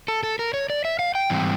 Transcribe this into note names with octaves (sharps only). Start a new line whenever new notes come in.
A4
A4
A#4
C#5
D5
E5
F5
G5
G#2 E3 G3 C4